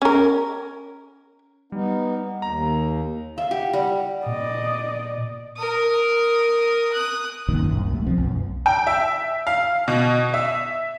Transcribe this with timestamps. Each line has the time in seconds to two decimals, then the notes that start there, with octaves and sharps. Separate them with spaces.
0.02 C#4 A#4
1.72 G3 B3 D#4
2.42 D#2 A#5
3.38 E5 F5
3.51 G4 F#5
3.73 G3
4.26 A#2 D5 D#5
5.57 A#4 D#6
6.92 D#6 F#6
7.48 C2 F#2 A#2 D#3
7.71 C2 F#2
7.90 C2 C3 A3
8.06 C#2 F3 C4
8.18 B1 F#2
8.66 G5
8.87 E5
9.47 F5
9.88 B2
10.34 E5